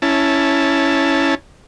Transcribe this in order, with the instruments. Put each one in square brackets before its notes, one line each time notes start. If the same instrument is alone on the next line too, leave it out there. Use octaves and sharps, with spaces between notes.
[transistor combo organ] C#4 E4 A5